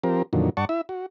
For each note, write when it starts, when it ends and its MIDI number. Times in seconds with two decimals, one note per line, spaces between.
0.04 0.22 53
0.04 0.22 60
0.04 0.22 67
0.04 0.22 70
0.33 0.50 41
0.33 0.50 46
0.33 0.50 50
0.33 0.50 51
0.33 0.50 54
0.57 0.65 43
0.57 0.65 74
0.57 0.65 78
0.57 0.65 81
0.57 0.65 85
0.69 0.81 64
0.69 0.81 76
0.89 1.06 66